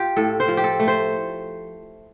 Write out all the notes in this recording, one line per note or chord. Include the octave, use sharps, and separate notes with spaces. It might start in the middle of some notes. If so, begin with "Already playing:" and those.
Already playing: F4 G4
A2 A4
C5
F3
G4
A4
A3
C5